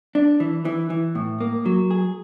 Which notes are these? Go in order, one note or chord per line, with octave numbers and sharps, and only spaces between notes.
D4
E3
E3
E3
A2
A#3
F#3
G#4